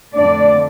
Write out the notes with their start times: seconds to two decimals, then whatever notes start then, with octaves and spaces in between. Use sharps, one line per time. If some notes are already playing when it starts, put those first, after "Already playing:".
0.13 F2 D3 A3 D4 D5